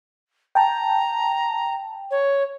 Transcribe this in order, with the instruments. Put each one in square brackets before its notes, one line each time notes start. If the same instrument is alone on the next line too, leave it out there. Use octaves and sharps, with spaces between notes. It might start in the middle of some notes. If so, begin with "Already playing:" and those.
[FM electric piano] G5 A5 [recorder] A#5
[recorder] C#5